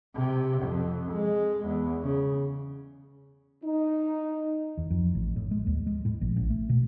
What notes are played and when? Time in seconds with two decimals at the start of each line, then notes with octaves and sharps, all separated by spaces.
0.16 C3
0.63 F2
1.12 G#3
1.66 E2
2.03 C#3
3.64 D#4
4.77 E2
4.90 F2
5.15 A1
5.36 A2
5.51 G#3
5.67 D#2
5.87 G#3
6.05 A2
6.21 A#1
6.36 A1
6.50 A3
6.69 B2